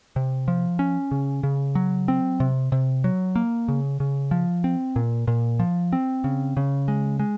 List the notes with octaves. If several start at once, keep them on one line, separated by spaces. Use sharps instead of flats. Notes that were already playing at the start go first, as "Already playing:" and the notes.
C3
F3
C#4
C#3
C#3
F#3
C4
C3
C3
F#3
A#3
C#3
C#3
F3
C4
A#2
A#2
F3
C4
C#3
C#3
G#3
G#3